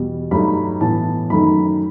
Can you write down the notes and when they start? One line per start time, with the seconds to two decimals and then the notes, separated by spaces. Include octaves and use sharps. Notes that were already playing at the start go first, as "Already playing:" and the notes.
Already playing: E2 B2 G3
0.31 G2 F#3 A3 D#4 B5
0.81 A2 E3 B3 A5
1.30 F#2 D#3 A3 D#4 B5